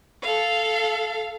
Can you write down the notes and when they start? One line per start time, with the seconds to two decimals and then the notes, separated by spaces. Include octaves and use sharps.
0.23 A4 F5